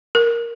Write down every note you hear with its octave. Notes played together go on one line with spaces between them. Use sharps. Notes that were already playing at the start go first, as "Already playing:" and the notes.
A#4